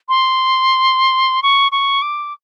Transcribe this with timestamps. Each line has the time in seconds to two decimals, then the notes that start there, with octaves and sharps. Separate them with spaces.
0.09 C6
1.42 C#6
1.72 C#6
2.02 D6